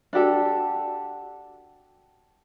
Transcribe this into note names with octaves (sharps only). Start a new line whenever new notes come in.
D4 F#4 G4 A4